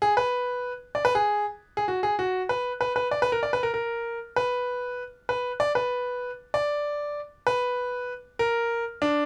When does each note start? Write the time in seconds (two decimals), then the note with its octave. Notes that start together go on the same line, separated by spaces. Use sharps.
0.02 G#4
0.17 B4
0.95 D5
1.05 B4
1.15 G#4
1.77 G#4
1.88 F#4
2.03 G#4
2.19 F#4
2.49 B4
2.81 B4
2.96 B4
3.11 D5
3.22 B4
3.32 A#4
3.43 D5
3.53 B4
3.63 A#4
3.74 A#4
4.36 B4
5.29 B4
5.60 D5
5.75 B4
6.54 D5
7.47 B4
8.39 A#4
9.02 D4